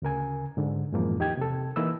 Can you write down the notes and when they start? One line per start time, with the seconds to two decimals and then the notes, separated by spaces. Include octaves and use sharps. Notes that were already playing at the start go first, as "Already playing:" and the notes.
0.02 D2 C#3 A#4 G#5
0.57 G#2 D3
0.92 F#2 A2 E3 F3 G#3 A#3
1.19 E2 D#4 G4 G5 G#6
1.37 C3 A4
1.76 E3 A#3 D#4 B4 E6